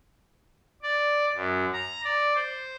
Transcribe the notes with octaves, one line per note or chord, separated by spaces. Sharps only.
D5
F#2
A#5
D5
C5